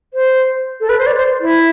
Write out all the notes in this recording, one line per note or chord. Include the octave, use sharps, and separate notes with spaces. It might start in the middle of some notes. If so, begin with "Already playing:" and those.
C5
A4
B4
C5
D5
C5
E4